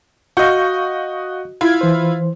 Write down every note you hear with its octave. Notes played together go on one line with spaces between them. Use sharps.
F#4 D#5 F5 C#6 G6
E4 F4 F5 G#6
E3 C5